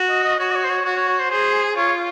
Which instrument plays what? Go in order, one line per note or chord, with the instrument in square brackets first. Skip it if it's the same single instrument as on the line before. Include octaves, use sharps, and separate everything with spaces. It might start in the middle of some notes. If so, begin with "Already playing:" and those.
Already playing: [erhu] F#4
[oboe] D#5
D#5
[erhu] F#4 [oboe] C#5
[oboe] D#5
C#5
C5
C#5
[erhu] F#4 [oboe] C#5
[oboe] C#5
C#5
C5
[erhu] G#4 [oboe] C5
[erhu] F4 [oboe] C#5